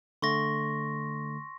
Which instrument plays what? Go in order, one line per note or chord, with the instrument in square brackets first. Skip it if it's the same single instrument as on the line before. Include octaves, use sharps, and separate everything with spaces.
[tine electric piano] D3 A3 [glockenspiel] C6 C#6 A#6